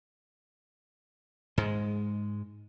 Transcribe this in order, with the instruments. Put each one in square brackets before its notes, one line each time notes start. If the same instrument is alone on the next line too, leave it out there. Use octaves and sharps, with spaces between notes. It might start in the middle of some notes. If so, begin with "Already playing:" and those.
[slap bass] G#2 G#3